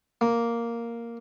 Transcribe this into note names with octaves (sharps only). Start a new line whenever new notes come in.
A#3